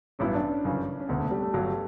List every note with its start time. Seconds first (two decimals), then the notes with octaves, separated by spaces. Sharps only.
0.19 A1 G2 F#3 B3 C#4 E4
0.34 D4
0.49 C#4
0.64 G1 F#2 C#3 E3
1.00 C#4
1.09 E1 D2 D3 B3
1.20 A3
1.31 G3
1.42 A3
1.53 G1 G2 F#3 G3